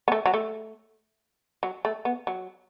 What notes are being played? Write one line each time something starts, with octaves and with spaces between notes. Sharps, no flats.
B3
A3
F#3
A3
F#3
A3
B3
F#3